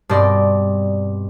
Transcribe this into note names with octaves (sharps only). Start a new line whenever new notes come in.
G2 B2 C4 D5 D#5